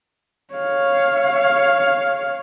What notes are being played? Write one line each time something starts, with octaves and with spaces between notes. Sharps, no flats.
C#5 F5